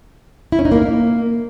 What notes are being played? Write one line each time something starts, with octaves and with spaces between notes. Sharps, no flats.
E4
C#4
D#4
A#3